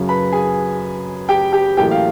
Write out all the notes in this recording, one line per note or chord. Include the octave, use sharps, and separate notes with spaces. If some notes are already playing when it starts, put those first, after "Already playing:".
Already playing: F#2 C#3 F#3
B4 B5
G#4 G#5
G4 G5
G4 G5
A1 A2 F#3 A#3 G4 G5
F5